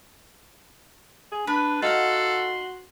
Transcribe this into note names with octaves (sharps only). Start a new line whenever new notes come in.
G#4
D4 B4 B5
D#4 F#4 A4 F5 F#5 C6